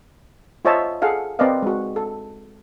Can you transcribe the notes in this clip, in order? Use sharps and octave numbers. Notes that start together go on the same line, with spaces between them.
F4 C5 C#5 D#5 E5 A5
G#4 A4 F5 F#5
C4 A#4 B4 D5 D#5 F5
G#3 F#4
A4